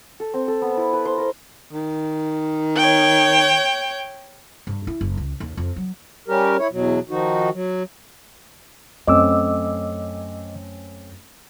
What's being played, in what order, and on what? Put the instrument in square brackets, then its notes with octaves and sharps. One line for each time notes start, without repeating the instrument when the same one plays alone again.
[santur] A4
C4
A4
B3
E4
B4
C5
A#4
[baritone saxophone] D#3
[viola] C#5 G5
[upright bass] G2
E4
F#1
C#2
D#2
F2
F#3
[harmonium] G3 C#4 G4 A#4
E4 C#5
E2 B2 F#3
D#3 F3 D#4 F#4
F#3
[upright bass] F#2 [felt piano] A3 C4 C#4 [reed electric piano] D#5 D6 E6